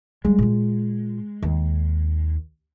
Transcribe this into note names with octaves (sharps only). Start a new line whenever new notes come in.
G3 G#3 A#3
A#2 F4
D#2